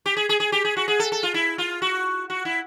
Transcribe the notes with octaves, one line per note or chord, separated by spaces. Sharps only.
G4
G#4
G#4
G#4
G4
G#4
F#4
G#4
A4
A4
F4
E4
F4
F#4
F#4
E4